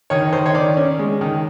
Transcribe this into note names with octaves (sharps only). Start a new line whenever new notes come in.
D#3 C#5
D#3 C5
C#5
D#3 D5
C#4
G#3
D#3